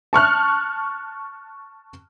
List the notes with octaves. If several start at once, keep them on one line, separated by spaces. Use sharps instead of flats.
A5 C#6 F6 F#6